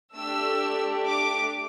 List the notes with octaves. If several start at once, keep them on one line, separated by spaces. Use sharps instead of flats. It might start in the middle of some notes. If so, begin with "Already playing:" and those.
A3 D4 G4 E6
D6